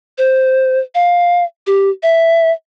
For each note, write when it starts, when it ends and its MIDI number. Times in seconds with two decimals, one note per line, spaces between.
0.18 0.79 72
0.95 1.44 77
1.67 1.89 67
2.03 2.51 76